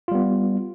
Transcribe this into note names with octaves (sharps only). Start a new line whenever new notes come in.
G3 B3 F4